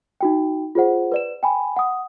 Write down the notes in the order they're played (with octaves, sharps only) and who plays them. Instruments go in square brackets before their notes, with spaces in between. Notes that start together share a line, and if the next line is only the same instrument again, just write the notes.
[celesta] D#4 F#4 G5
F4 G#4 C5 F#5
B4 D5 E7
G5 G#5 B5
F#5 D#6